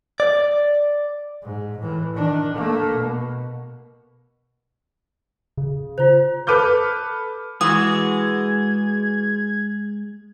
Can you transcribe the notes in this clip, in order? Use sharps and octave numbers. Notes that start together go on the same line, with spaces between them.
D5
G#2
A2 E3
D#3 D4
A3 A#3
B2
C#3
F4 C5
A4 B4 D6 F6 G6
E3 G#3 F#4 G#4 D#6 G#6